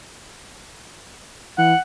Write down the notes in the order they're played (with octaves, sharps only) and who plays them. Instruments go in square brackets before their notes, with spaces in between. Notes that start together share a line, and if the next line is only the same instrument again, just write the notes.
[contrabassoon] E3 [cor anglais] F#5